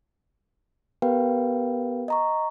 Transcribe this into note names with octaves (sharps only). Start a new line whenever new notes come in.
B3 G4 A#4 B4 F5 G5
D#5 A#5 C#6